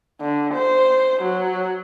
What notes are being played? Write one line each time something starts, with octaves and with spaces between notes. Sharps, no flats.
D3
C5
F#3